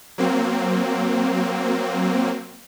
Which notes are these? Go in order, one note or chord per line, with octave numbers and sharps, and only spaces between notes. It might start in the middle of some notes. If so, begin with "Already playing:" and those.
F#3 A#3 C4